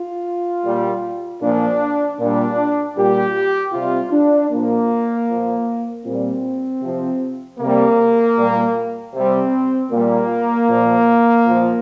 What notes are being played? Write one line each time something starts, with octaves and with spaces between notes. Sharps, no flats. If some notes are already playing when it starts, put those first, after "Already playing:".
Already playing: F4
A#2 G3
A#2 F3 D4
A#2 G3 D4
A#2 G3 G4
C3 G3 F4
D4
A#2 F3 A#3
A#2 F3
A#2 G3 C4
C3 F3
C3 G3 A#3
A#2 G3
C3 G3 C4
A#2 G3 A#3
A#2 F3
A#2 F3